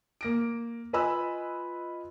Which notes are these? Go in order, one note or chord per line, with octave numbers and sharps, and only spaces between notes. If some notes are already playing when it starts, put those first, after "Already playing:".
A#3 A#6 D7
F4 B4 D#5 G#5 B5 E6